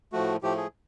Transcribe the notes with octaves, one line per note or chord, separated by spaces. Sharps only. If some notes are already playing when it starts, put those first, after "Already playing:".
A2 F3 A3 F#4
A2 F3 A3 G4
G#4